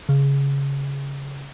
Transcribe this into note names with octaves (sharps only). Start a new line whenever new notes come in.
C#3